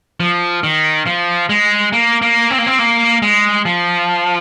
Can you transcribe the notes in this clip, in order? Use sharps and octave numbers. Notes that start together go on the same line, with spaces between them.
F3
D#3
F3
G#3
A#3
A#3
C4
A#3
C4
A#3
G#3
F3